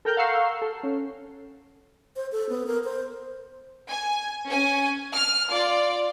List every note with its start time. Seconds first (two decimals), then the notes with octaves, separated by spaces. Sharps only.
0.05 A4 A#4 G5 A#5 F6 G6
0.17 F5 F#5 A#5 C#6 E6 C7
0.62 A4
0.83 C#4
2.16 C5
2.32 A4
2.49 B3
2.67 A#4
2.84 C5
3.89 G#5
4.46 C#4 G#5
5.14 F6
5.50 F4 D5